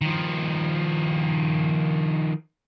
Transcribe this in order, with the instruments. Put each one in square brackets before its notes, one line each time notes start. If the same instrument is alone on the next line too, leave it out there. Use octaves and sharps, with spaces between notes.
[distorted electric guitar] D#3 F3